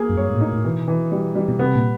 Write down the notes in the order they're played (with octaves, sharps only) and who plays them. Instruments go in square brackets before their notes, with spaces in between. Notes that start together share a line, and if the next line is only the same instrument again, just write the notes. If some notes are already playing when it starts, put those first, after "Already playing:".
Already playing: [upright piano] A#3 G#4
[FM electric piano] F#2
[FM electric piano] G2 [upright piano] C#5
[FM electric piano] G#2
A#2
[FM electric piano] A2 [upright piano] D#4
[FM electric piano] A2
[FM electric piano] B2 [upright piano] E3
[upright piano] E3
G3
G3
[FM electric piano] B2
[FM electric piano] C3 [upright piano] B3
[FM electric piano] A#2